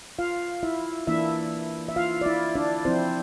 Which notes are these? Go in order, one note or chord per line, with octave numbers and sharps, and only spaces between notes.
F4 F5
E4 E5
E3 A#3 D4 E4 E5
E5
F4 F5
D5
E4 E5
D4 D5
F3 C4 E4 C5